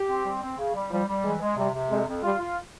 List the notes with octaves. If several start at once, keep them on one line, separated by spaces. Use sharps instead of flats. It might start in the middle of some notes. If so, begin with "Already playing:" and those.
Already playing: G4
C4
G3
C4
C#3
G3
F3 G3
G3
E3 G#3
G#3
C3 G3
C3
F2 G#3
F2
G3 F4
F4